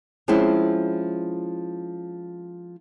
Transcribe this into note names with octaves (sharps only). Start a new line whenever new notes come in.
F3 G#3 C4 C#4 E4